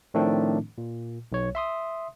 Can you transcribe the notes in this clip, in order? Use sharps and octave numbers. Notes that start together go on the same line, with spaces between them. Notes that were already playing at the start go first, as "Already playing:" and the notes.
A2 D#3 F3 A3 C4 D4
A#2
B1 C#5
E5 C6 D#6